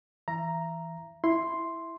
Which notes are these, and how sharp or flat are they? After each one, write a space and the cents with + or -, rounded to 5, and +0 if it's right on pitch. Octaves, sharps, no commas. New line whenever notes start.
E3 +0 E5 +35 A#5 +0
E4 +0 C6 +0